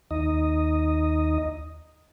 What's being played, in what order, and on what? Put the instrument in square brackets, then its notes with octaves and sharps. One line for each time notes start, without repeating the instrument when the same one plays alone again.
[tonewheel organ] D#2 D#4 D#5